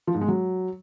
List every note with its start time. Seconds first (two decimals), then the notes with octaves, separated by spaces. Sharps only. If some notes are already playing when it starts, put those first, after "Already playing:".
0.07 F3
0.14 G#2
0.21 G#3
0.28 F#3